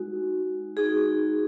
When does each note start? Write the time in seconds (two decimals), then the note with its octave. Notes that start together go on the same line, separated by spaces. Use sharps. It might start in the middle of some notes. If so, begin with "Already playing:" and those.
Already playing: G#3 D#4 F#4
0.77 G#3 D#4 F#4 G#4